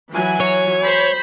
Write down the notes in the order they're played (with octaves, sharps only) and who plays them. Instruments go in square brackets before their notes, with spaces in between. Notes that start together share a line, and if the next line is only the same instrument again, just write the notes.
[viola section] E3 F#3 G#5
[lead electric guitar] C#5
[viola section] C5 B5